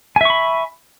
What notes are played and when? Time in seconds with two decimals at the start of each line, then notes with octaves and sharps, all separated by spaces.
0.16 G#5
0.21 E5
0.25 C#6
0.30 B5